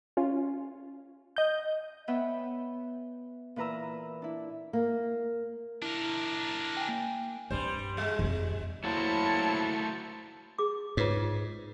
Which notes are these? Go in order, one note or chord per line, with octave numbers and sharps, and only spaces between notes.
C#4 F4
D#5 G6
B3 B4 C#5 E5 F#5 G5
A#2 E3 B4 A#5 E6
D4 E4
A#3
D4 E4 A#4
G5 G#5
A#3
G2 G3 C4 C5
G3 G#3
F2 D3
F#3 A3 A#3 E4 F#4 C5 A5 C#7
G#4 D6
G#2 F4 B4 C#5